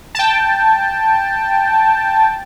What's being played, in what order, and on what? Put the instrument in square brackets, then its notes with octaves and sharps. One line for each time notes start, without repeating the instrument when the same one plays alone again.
[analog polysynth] G5 A5